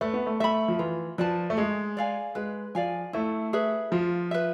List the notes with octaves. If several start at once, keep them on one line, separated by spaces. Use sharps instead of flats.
A3 B4
B3
A3
A3 E5 B5
F3
E3 F4
F3 B4 D5 A5
A3
G#3 G#4
D5 F5 G#5
G#3 B4
F3 D5 F5 G#5
A3 E4
G#4 B4 E5
F3 F4
B4 E5